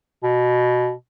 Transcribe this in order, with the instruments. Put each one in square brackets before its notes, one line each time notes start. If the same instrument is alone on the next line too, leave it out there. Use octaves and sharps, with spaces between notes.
[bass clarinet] B2